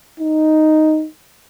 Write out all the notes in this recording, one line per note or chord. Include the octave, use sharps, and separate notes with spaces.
D#4